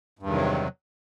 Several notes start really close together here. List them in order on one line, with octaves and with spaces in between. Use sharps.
G2 E2 D#3 C3 F#3